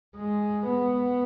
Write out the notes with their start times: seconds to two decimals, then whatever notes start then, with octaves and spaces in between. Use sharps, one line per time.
0.16 G#3
0.68 B3